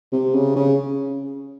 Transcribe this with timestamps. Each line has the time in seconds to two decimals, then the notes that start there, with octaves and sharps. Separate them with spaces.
0.12 C3
0.34 C#3
0.56 C#3